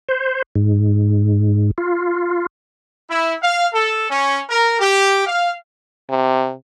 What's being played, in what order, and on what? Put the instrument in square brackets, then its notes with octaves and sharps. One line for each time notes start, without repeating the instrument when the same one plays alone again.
[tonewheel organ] C5
G#2
F4
[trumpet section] E4
F5
A4
C#4
A#4
G4
F5
[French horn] C3